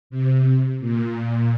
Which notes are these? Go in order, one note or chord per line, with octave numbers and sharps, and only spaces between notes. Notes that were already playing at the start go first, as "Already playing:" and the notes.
C3
A#2